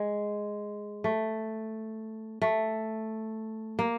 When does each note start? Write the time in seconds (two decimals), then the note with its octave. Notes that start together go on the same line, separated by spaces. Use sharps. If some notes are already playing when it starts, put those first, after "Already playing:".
Already playing: G#3
1.04 A3
2.42 A3
3.79 A#3